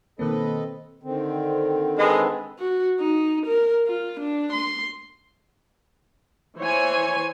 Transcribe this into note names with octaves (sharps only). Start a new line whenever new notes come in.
B2 D#3 A#3 C4 A4 B4 D#5
D3 D#3 C4
G#3 A4 B4
F#4
D#4
A#4
F4
D4
C6
E3 C5 C#5 G#5